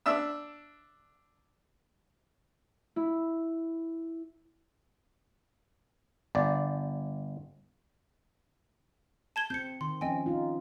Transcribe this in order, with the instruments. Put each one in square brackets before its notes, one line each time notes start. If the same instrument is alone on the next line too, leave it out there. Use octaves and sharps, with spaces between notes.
[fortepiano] D4 E5 E6
[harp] E4
[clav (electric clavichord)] G1 D5
[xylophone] A5 G#6 G7
[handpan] C4 [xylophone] G6 C#7
[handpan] D#3 [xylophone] C6
[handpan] F3 C4 C#4 [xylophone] D#5 G5 G#5
[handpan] D#4 F4